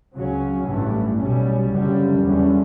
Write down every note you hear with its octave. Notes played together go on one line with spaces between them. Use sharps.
C#2 C#3 F#3 C#4
A1 G2 E3 A3
B1 B2 G3 C#4
F#1 F#2 D3 G3
E2 D3 G3 C#4